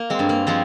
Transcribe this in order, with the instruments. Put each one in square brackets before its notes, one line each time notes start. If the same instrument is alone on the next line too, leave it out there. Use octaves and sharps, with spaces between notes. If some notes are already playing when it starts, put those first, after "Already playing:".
Already playing: [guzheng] A#3
G#3 C4
G2
A#3
F3 G#3 C4